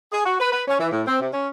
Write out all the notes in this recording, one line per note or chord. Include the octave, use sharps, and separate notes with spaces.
G#4
F#4
B4
B4
C#4
E3
A2
C4
C3
C#4